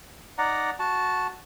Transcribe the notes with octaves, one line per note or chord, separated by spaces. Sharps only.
D#4 D5 F#5 A#5
F#4 A5